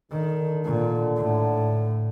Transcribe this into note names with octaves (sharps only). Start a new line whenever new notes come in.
D3 D#3
A#2 D3
A2